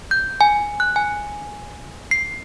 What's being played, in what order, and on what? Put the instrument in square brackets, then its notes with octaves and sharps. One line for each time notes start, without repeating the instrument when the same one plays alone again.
[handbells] G6
G#5
F#6
G#5
C7